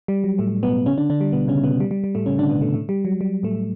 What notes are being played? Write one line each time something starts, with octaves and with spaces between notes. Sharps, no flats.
G3
F#3
A2 A3
B2 B3
C#3 C#4
D3 D4
D3 D4
G3
B2 B3
C#3 C#4
B2 B3
G3
G3
G3
A2 A3
C#3 C#4
D3 D4
B2 B3
A2 A3
A2 A3
G3
F#3
G3
A2 A3